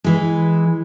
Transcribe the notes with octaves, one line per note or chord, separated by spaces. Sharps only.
E3 G#3